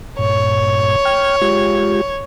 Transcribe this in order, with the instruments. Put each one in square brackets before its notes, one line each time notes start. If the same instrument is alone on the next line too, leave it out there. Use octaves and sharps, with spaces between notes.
[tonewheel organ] G2 A#2 [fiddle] C#5
[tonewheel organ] G5 F6
G#3 F4 G4